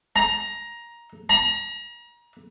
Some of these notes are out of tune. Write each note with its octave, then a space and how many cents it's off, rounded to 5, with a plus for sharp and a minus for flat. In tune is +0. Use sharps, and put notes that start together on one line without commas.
A#5 +15
A#5 +35